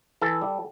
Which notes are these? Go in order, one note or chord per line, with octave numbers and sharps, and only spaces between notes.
E3 A4
G3